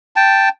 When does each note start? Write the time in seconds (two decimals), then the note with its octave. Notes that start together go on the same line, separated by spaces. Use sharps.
0.16 G5 A5